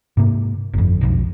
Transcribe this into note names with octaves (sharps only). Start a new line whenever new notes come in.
G#2 C3 A#3
G1 F2
E1 B1 F2